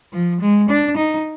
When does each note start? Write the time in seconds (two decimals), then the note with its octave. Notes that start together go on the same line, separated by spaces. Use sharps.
0.13 F3
0.41 G#3
0.69 D4
0.97 D#4